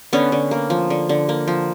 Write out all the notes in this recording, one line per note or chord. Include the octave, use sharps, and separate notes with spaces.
D3 B3 C#4
D3
A#3
F3
D3
D3
A#3
F3